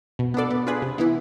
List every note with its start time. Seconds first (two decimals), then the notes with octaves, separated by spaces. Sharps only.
0.19 B2
0.34 B3 D4 A4 D5
0.50 B3
0.67 D4 F4 G#4 B4
0.82 C3
0.98 E3 B3 E4